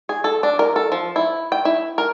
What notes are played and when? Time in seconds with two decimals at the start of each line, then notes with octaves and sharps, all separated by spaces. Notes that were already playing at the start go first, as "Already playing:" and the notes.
0.09 G#4
0.24 A4
0.43 D4
0.59 A#4
0.76 A4
0.92 F3
1.16 E4
1.52 G5
1.65 E4
1.98 A#4